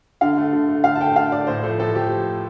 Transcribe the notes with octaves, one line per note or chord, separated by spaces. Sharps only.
D3 F5
A3
D3
A3
D3 F5
A5
A3 G5
D3 F5
A3 D5
A2 C5
F3 A3 C5
A2 A4
F3 G4